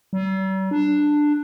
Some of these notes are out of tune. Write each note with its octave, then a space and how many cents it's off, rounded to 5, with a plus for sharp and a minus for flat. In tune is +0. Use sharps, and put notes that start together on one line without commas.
G3 -45
D4 +10